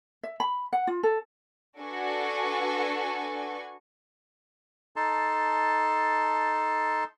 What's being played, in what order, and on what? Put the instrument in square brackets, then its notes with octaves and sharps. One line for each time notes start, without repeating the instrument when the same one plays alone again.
[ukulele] E5
B5
F#5
F4
A4
[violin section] D4 F#4 A4 B4 G#5 C#6
[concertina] D#4 A4 A5 C6